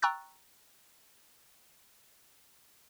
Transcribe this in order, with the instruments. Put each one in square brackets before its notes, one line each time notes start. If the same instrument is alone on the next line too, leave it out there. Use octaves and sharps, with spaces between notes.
[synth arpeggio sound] G5 A#5 C#6 E6 F#6 A6